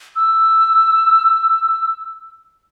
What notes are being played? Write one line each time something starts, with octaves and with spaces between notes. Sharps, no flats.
E6